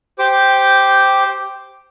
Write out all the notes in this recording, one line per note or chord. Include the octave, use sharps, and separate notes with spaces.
G4 C5 D6